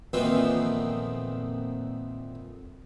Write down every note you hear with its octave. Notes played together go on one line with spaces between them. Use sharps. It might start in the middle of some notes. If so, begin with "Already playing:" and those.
F2 A#2 D#3 E3 B3 C4